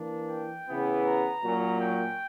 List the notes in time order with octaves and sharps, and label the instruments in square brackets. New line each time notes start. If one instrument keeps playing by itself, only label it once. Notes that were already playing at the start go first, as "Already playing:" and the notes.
Already playing: [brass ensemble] E3 A#3 D4
G5
C#3 E3 B3
A#5
A#2 F#3 C#4
G5